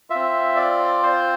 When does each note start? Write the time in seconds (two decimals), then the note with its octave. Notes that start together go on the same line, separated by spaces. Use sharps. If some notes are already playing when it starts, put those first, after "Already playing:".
0.10 F4 E5
0.15 C4
0.56 D5
1.03 C5